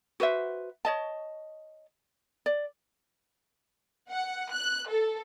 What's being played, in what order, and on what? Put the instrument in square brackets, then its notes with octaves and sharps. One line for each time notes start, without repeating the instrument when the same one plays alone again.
[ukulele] F#4 B4 C5 E5
C#5 D#5 A5
D5
[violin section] F#5
F#6
A4